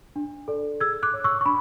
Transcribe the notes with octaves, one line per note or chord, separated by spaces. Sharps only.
D4
A4 D5
G#4 E6 G#6
D6 F#6
C#5
C#6 E6
C#6
D4 B5